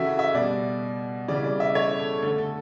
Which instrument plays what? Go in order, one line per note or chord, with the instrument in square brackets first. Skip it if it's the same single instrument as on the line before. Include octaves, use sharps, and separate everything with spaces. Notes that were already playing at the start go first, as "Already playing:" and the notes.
Already playing: [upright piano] C#3 E3 F#4 A4 E5
E5
B2 G3 D5
C#3 E3 G3 D5
D5
E5
C#5
A4
D3 A3 A4
A4